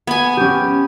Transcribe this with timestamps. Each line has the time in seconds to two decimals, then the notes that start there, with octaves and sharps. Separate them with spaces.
0.07 B3 G#5
0.37 C#4 G4